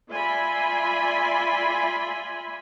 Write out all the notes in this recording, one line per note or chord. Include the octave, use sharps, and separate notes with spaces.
F4 D5 E5 G#5 B5 C6